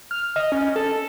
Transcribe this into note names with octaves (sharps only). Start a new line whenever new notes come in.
F6
D#5
C#4
A4